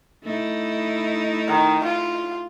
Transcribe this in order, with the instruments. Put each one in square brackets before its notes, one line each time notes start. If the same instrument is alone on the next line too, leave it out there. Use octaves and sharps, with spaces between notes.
[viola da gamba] A3 D#4 E4
[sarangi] D#3
F4